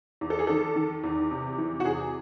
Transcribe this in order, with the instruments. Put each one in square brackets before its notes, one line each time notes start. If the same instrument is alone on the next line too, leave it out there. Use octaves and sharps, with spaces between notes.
[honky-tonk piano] E2
A4
G#4
D#3 A4
D#3
E2
C3
E3
F#4
E2 G#4